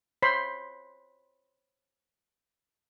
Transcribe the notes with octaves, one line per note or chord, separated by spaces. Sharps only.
C5 C#5 B5 C6